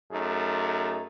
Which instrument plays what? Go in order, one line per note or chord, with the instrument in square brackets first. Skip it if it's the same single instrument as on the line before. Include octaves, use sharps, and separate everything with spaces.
[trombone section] F#2 A3 D#4 G#4